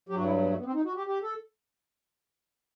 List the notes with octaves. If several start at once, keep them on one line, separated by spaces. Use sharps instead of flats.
G2 F#3 F#4 G4
E4
A3
B3
A3
B3
C4
D#4
F#4
G4
G4
A4